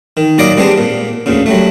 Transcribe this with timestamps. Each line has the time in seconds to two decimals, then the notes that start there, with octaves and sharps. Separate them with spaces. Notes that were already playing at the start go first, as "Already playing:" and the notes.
0.17 D#3
0.38 A#2 F#3 D5 D#5 F5 D6
0.57 G3 G#3 B3 C4 D4 G4
0.78 A#2
1.26 D2 A#2 C#3
1.46 F#3 G3 A3